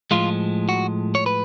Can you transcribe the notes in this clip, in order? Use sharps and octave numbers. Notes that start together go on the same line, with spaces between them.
A2 F3 G#3 F4
F#4
C#5
B4